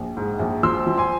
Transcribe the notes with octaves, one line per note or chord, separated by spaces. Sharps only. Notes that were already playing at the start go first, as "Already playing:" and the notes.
Already playing: A#1
G#2
A#1
F3 C6 E6
F3
G#5 C6